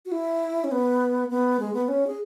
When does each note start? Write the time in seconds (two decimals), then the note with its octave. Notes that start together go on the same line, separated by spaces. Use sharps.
0.06 F#4
0.12 E4
0.64 C#4
0.72 B3
1.30 B3
1.60 G#3
1.74 B3
1.88 C#4
2.07 G#4